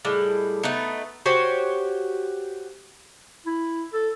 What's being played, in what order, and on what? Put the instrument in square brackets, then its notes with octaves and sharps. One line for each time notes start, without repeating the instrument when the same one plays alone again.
[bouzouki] A2 G3 G#3
A3 B3 D#4
F#4 G4 C5 C#5
[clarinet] E4
A4